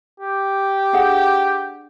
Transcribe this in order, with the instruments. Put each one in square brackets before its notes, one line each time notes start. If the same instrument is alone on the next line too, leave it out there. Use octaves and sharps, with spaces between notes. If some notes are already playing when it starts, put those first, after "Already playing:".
[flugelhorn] G4
[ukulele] D4 G#4 F#5